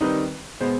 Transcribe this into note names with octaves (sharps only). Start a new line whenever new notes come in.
D#3 G3 C4 D#4 B4
B2 G#3 B3 C5